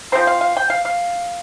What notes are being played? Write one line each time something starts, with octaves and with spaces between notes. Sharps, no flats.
F3 A3 C4 C5
F5
F5
G5
F5
F5